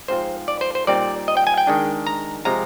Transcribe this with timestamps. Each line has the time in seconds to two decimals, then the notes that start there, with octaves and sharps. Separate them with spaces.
0.08 G#2 F3 C4 F4 C5
0.48 D5
0.61 C5
0.75 C5
0.87 A#2 G3 C4 D#4 D5
1.28 D#5
1.37 G5
1.47 G#5
1.58 G5
1.67 D#3 G#3 D4
2.07 A#5
2.45 C3 F3 G#3 A#5